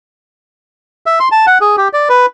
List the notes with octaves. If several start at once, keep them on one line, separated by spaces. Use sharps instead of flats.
E5
C6
A5
F#5
G#4
G4
D5
B4